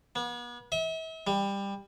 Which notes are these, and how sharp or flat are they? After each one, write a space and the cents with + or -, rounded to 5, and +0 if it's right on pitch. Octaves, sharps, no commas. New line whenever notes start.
B3 -40
E5 -40
G3 +20